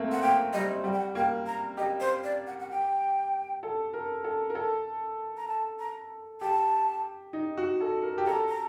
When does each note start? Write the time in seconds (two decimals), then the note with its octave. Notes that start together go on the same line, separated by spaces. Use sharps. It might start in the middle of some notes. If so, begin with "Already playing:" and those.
Already playing: A3 A#3 C4
0.12 F#5
0.22 A#3 G5
0.53 G3 D#5
0.84 G3 F#5
0.92 G5
0.99 F#5
1.15 A#3 G5
1.46 A#5
1.77 G4 D#5
2.00 C5
2.24 D5
2.47 F#5
2.59 F#5
2.70 G5
3.63 A4
3.93 A#4
4.24 A4
4.50 A#4
4.55 A4
5.37 A#5
5.48 A5
5.79 A#5
6.41 G4 A5
7.33 D#4
7.57 F#4
7.80 A4
8.03 A#4
8.18 G4
8.26 A4 A#5
8.48 A#5